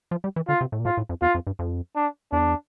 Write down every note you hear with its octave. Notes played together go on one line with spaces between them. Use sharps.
F3
G3
E3
D3 F4
C3
A2
A#2
A2 F4
A2
F2
E2 F4
F2
G2
F2
D4
E2 D4